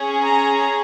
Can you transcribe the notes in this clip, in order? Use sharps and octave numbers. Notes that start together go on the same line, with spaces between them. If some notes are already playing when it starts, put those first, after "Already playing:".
Already playing: C#4 G#4
A#5